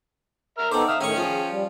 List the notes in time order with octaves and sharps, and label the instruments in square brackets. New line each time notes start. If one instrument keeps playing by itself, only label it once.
[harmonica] A#4 E5 F6
[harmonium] B3 D#4 A4 [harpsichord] C4 C5 [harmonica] D6
[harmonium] E5 F5 [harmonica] D#6 F6
[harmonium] A2 D#3 A3 [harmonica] C#4 G5 [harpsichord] G#4 C#6
[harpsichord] F3 F4 [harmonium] G#4
[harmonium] G3